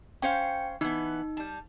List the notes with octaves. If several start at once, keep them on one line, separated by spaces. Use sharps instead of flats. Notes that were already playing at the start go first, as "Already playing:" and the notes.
C#4 C5 F5 G5 C#7
E3 B3 D#4
G3 A5